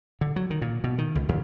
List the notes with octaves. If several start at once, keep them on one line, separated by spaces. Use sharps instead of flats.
D3
F#3
D#3
A#2
B2
D#3
C#2
D#2